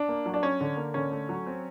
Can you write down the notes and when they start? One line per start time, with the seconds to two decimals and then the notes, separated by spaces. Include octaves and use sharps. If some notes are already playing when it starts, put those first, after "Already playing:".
Already playing: D4
0.09 A#3
0.26 F#3
0.34 D4
0.43 C#4
0.61 D3
0.77 A#3
0.94 D3 C#4
1.12 A3
1.29 F#3
1.47 C4